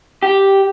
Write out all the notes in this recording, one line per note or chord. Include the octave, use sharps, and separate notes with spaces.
G4